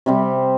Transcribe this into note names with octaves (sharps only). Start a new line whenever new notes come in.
C3 G3 C4